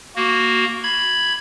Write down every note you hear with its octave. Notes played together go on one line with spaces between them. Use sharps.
A#3 F#4
B5 G#6